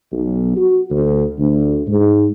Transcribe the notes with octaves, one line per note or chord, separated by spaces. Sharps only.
B1
F#4
D2
D2
G#2